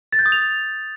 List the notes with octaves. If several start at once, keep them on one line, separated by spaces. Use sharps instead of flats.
A6
G6
D#6
F7